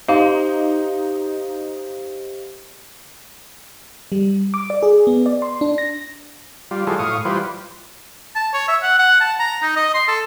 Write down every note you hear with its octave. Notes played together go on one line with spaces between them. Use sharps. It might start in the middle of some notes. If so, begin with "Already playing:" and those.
D#4 G4 C5 D#5 F5
G3
D6
D5
G#4
B3
D5
C6
D4
A#6
G3 F4
E3 F#3 G3 F4 G#4 A4
A2 F5 C#6 D#6
E3 G3 F4 B4 C5
A5
C#5
E5
F#5
F#5
A5
A#5
D#4
D#5
C6
A4